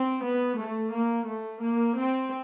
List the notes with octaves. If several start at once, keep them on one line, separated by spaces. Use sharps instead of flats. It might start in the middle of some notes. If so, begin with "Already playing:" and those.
Already playing: C4
B3
A3
A#3
A3
A#3
C4